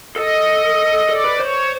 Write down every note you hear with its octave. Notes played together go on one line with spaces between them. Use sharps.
A4 D#5
A4 D5
B4
C5 C#5